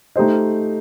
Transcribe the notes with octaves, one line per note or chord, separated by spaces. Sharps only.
A3 D#4 G4 C5 D#5